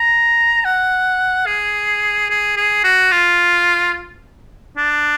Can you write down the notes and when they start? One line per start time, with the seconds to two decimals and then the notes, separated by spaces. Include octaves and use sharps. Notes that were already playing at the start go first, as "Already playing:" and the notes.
Already playing: A#5
0.65 F#5
1.46 G#4
2.30 G#4
2.57 G#4
2.84 F#4
3.12 F4
4.77 D4